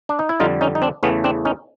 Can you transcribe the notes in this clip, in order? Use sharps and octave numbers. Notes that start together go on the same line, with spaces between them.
D4
D#4
E4
F2 D3 G3 D#4 F4
C#4 D#4
D#4
C4 D4
E2 C#3 E3 A3 B3 C#4
C4 D4
C#4 D#4